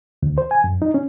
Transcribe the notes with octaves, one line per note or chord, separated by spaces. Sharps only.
D2
C5
G#5
F#2
D#4
C#4